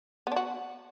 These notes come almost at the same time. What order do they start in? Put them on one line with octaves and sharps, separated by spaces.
B3 D4 F#4